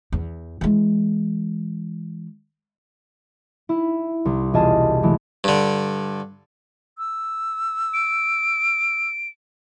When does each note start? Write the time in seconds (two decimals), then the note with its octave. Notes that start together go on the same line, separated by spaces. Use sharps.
0.12 E2
0.61 E3 G#3
3.69 E4
4.25 C2
4.53 E1 F4 G#4 D#5 A5
5.03 E3 G#3 A3
5.44 G2 D3
6.98 E6
7.94 D7